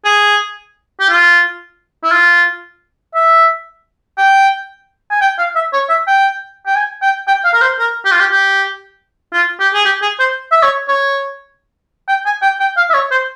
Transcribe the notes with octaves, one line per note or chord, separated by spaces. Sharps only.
G#4
G4
F4
E4
F4
E5
G5
G#5
G5
F5
E5
C#5
E5
G5
G5
G#5
G5
G5
F5
A#4
C5
A#4
G4
F4
G4
G4
F4
G4
G#4
G4
G#4
C5
E5
C#5
C#5
G5
G#5
G5
G5
F5
E5
C#5
C5